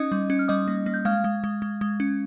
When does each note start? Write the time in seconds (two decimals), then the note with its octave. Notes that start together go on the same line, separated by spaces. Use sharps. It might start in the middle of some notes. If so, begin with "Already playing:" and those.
Already playing: C#4 D#4 D#5 D#6
0.12 G3
0.30 C#4
0.39 F6
0.48 G3 D#5 D#6
0.68 A#3
0.86 A#3
0.94 G6
1.05 G#3 F5 F6
1.24 G#3
1.44 G#3
1.62 G#3
1.81 G#3
2.00 C#4